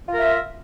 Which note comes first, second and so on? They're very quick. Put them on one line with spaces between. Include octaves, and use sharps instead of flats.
F4 A#4 E5